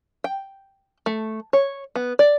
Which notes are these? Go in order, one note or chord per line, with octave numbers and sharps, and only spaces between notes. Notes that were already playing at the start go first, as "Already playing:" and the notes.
G5
A3
C#5
B3
D5